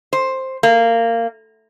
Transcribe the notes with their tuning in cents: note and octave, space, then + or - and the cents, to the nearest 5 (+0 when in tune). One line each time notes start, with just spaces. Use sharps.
C5 +10
A#3 -20